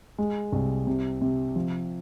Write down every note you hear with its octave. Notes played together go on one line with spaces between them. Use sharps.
G#3
C2
C3
C3
F3